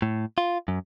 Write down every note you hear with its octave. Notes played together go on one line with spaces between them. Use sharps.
A2
F4
F#2